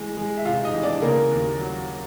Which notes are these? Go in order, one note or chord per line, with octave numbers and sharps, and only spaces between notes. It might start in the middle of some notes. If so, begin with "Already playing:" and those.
Already playing: E3 G#3
G#3
E5
C3 F4 F5
D#4 D#5
E3
D4 D5
C#3 A#3 A#4
D#2
F#3